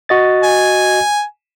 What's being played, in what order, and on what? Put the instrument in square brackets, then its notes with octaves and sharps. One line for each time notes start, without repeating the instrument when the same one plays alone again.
[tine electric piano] F#4 D#5 A6
[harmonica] G#5